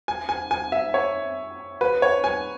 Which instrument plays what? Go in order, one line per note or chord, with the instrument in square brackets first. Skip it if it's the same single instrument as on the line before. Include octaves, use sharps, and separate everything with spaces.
[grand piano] G#5
G#5
G#5
E5
C#5
B4
C#5
G#5